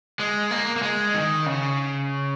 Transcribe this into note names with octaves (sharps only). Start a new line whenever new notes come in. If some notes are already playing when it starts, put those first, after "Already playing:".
G#3
A#3
A#3
G#3
D#3
C#3